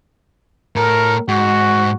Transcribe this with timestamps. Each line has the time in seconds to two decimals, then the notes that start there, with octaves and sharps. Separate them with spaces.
0.76 A2 A4 A#4
1.28 G#2 F#4